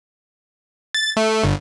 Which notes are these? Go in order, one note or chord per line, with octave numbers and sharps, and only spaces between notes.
A6
A3
G1